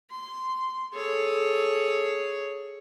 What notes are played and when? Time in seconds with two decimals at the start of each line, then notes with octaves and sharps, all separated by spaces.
0.11 C6
0.94 G#4 A4 C#5